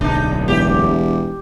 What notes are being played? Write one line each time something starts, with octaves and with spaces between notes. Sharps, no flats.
D1 B1 D4 D#4
E1 G4